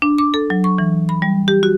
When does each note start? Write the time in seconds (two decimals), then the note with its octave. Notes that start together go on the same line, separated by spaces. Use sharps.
0.02 D4
0.18 D6
0.34 A4
0.50 F#3
0.64 C#6
0.78 E3
1.09 B5
1.22 G3
1.48 G4
1.63 F#4